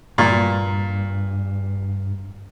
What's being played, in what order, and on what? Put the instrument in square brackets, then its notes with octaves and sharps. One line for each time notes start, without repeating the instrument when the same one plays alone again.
[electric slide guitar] G2 [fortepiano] A#2